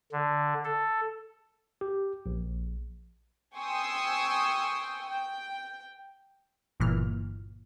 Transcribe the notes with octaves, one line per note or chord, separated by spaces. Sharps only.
D3
A4
G4
A#1
G5 G#5 C6 C#6 D#6 E6
G5
G1 A#2 E3 F6